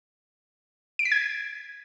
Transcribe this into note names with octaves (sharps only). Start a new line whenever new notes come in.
D7
B6
G#6